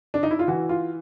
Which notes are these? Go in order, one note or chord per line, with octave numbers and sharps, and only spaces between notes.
D4
D#4
E4
F4
E3 F#4
F4